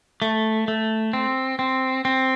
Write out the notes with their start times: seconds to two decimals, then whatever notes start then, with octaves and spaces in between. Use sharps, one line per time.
0.22 A3
0.68 A3
1.13 C4
1.59 C4
2.05 C4